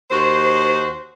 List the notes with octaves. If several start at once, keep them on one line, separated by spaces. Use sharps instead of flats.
D#2 F#4 C5